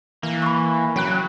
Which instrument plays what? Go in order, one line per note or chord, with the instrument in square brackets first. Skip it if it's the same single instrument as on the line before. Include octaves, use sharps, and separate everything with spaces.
[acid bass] E3 [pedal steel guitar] A#3
[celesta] B5 C#6
[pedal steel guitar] C#3 G5 F#6 [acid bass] F#3